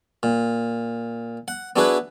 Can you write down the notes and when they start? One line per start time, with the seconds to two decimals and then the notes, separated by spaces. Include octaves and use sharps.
0.23 A#2
1.48 F#5
1.76 B3 D4 E4 F#4 G#4 B4